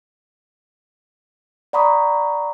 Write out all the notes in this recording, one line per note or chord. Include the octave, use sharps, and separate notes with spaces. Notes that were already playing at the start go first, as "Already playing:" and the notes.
D5 F#5 A#5 B5 C#6 D#6